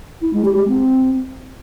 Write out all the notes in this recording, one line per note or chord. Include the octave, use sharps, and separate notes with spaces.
E4
G#3
G4
G#3
C4